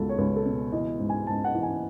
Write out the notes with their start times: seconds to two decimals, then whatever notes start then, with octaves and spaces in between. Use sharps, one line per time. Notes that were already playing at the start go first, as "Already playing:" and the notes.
Already playing: C#2 B2 F#4 A4
0.09 C#5
0.18 C#2 B4
0.36 A4
0.46 B2
0.72 E3 D#5
0.99 G#2
1.09 G#5
1.27 G#2 A5
1.44 F#5
1.55 E3
1.63 G#5